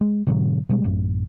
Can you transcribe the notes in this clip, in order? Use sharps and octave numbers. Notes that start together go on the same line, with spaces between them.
G#3
G#2 B2 D3 F#3
B2 G3 G#3
A1 F#2